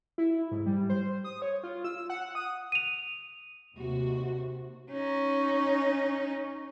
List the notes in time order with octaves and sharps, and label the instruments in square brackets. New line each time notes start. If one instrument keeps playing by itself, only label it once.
[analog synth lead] E4
G#2
G3
C5
D#6
C#5
F4
E6
F#5
D#6
[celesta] D#7 F7
[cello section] D#2 C3 F#4
[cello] C#4 D#4